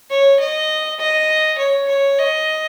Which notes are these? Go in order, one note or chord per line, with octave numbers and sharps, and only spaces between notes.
C#5
D#5
D#5
C#5
C#5
D#5